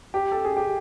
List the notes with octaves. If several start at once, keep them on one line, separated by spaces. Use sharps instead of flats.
G4
A4
G#4
G4